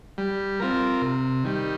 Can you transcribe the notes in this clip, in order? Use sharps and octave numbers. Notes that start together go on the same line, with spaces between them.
G3
C4 F4 A#4
C3
D#3 G3